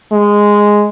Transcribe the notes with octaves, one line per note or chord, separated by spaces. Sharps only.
G#3